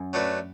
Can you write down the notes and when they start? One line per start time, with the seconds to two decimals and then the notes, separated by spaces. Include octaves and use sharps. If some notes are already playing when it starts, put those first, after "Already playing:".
Already playing: F#2
0.13 F#3 A3 D4 F#4 B4